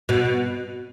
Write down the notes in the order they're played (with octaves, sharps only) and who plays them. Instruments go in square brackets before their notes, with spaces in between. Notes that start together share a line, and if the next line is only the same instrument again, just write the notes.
[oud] B2